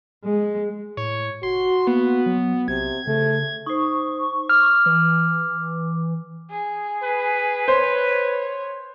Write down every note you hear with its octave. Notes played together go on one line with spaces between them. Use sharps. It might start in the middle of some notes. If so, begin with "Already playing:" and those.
G#3
A2 C#5
F1 F#4 C6
A#3 B3
F#3
B1 C3 G#6
C#3 A3
D#4 C5 C#6
D6 F6
E3
G#4
B4
C5 C#5